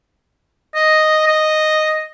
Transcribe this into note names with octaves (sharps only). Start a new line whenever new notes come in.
D#5
D#5